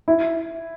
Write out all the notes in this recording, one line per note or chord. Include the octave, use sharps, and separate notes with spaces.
E4